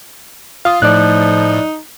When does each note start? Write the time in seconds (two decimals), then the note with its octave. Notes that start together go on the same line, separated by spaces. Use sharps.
0.65 F4 F5 D#6
0.82 A2 F3 D#4 D5 F#6